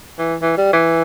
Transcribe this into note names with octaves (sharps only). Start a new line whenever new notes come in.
E3
E3
G3
E3